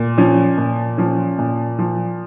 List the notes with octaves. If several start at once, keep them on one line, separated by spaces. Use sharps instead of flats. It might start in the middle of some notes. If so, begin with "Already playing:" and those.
Already playing: A#2
F3 C#4
A#2
F3 C#4
A#2
F3